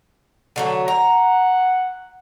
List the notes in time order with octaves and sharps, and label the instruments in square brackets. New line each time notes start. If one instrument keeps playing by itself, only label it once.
[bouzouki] D3 F#3 A3
[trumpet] F#5 [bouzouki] A#5